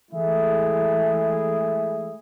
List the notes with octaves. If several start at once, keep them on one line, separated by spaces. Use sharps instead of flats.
E3 G#3 A3 E4 G#4 E5